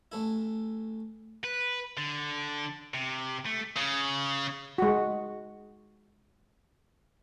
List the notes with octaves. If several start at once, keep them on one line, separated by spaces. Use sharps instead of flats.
A1 A3 E4
B4
D3
C3
A3
C#3
G#3 F#4